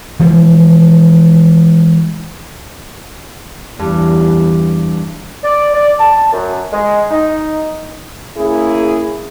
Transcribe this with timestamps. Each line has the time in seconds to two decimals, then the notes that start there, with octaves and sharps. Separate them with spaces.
0.20 E3 F3 G#3
3.79 E2 G2
5.44 D5
5.74 D5
5.99 A5
6.33 F#2
6.72 G#3
7.10 D#4
8.38 A#3 C#4 E4 G#4